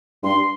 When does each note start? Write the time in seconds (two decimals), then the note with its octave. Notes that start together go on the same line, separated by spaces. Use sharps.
0.23 G2 C6